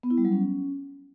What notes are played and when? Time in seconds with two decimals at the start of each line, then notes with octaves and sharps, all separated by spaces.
0.03 B3
0.10 E4
0.18 G3
0.25 F#3
0.32 C#4